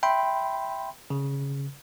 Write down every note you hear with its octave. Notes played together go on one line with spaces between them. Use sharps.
E5 G5 B5 C6
C#3